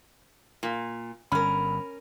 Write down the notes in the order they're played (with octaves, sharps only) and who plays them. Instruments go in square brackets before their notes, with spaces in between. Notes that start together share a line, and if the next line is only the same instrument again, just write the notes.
[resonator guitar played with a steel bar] A#2
[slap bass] G1 [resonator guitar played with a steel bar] C#4 A#4 [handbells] B5